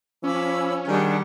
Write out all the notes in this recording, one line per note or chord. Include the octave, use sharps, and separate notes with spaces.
F3 C#4 B5 D6 E6
D#3 G3 D4 G#4 F#5